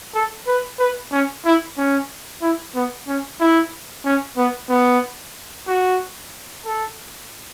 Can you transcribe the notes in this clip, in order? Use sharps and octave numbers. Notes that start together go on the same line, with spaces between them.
A4
B4
B4
C#4
E4
C#4
E4
B3
C#4
E4
C#4
B3
B3
F#4
A4